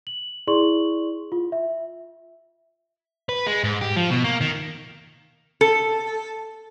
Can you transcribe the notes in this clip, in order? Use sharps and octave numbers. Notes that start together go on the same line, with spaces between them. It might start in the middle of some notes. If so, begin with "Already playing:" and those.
F#7
E4 G#4 D5 C6 C#6 F#7
F4
E5
B4
G#3
G#2
G4
F3
B2
A#3
D#3
A4